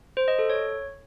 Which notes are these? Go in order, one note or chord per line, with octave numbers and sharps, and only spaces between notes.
C5
D#5
A4
C#5